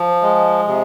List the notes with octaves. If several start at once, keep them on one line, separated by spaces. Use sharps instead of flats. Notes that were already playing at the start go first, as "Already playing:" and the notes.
Already playing: F3
G#3
C3